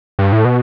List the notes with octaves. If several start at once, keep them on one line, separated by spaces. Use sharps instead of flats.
G2
A2
B2